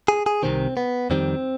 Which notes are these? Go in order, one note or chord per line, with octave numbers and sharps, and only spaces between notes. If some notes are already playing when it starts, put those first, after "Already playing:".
G#4
G#4
C2 C3 D#3 C4
B3
F2 D#3 G3 C4